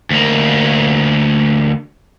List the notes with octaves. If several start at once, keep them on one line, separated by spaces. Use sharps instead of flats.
D2 A#3